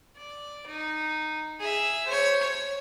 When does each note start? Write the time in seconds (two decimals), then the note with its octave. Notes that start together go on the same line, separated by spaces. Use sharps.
0.16 D5
0.67 D#4
1.60 G#4 E5
2.06 C5 C#5
2.42 C#5